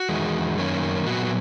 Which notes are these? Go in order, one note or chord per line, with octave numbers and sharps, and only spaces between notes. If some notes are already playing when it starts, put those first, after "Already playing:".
Already playing: F#4
E2 D#3 G#3
F#2 D#3 A#3 C#4
A#2 F#3 B3 F#4
F#4